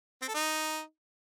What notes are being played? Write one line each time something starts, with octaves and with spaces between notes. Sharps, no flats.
C4
A4
D#4